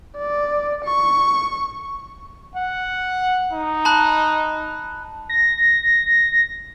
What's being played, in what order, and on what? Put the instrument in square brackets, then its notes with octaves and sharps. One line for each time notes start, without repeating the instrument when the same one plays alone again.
[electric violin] D5
C#6
[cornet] F#5
D#4
[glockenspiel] A5 B5 F#6
[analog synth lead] A#6